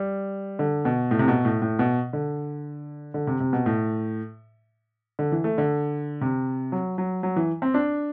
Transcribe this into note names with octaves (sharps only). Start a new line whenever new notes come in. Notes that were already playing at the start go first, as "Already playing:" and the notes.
Already playing: G3
D3
B2
A2
C3
B2
A2
A2
B2
D3
D3
C3
C3
B2
A2
D3
E3
A3
D3
C3
F#3
F#3
F#3
E3
C4
D4